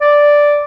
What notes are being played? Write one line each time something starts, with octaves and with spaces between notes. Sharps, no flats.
D5